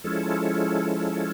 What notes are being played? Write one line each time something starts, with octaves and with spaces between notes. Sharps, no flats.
F3 G#3 C#4 E4 A4